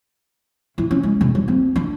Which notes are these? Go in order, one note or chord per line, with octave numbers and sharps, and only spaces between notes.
E4
C#4
G#3
E1
G3
C4
D4